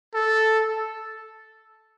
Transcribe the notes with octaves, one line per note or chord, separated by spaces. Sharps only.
A4